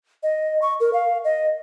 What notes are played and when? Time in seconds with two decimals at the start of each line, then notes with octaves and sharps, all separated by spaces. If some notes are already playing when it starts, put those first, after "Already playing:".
0.23 D#5
0.62 C#6
0.80 A#4
0.93 F5
1.24 D#5